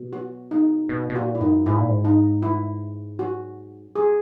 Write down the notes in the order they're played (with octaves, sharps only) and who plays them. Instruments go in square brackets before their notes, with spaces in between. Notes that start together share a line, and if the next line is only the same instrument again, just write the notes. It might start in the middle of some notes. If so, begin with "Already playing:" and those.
Already playing: [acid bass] B2
[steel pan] F#4
D#4
[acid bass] B2
B2
[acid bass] A#2 [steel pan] F#4
[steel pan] E4
[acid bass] F#2 [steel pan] D#4
[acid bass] G#2 [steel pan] E4
[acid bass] A#2
G#2
[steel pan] D#4
E4
F#4
[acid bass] F#2
[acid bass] G#2 [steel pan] G#4